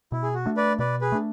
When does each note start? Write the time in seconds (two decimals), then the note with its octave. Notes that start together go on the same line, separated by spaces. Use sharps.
0.12 B2 E4
0.23 G#4
0.34 F#4
0.46 A3 D4
0.57 B4 D5
0.79 B2 B4 D5
1.01 G#4 B4
1.12 A3 D4